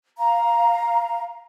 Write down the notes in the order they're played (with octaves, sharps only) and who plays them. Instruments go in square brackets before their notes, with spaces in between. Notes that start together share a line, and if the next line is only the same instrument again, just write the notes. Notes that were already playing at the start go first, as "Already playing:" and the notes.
[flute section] F5 A#5